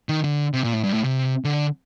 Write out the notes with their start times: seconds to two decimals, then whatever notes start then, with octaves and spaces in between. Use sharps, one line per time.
0.09 D#3
0.24 D3
0.54 C3
0.63 A#2
0.73 A2
0.84 G2
0.94 A2
1.04 C3
1.44 D3